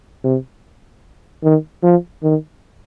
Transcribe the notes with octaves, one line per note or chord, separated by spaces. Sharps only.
C3
D#3
F3
D#3